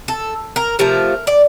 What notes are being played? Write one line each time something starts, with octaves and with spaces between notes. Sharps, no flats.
A4
A#4
C3 F3 A3 A#4
D5